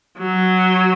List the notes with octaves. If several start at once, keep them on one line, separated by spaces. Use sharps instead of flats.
F#3